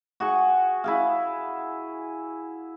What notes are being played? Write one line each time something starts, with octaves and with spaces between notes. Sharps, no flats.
F#4 G#4 C#6
E4 G#4 F5